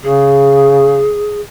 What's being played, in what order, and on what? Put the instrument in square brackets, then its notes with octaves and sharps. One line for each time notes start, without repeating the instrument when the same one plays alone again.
[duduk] C#3 [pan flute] G#4